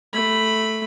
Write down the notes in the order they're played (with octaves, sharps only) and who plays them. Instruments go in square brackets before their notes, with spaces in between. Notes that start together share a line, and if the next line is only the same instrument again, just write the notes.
[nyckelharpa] A3 B5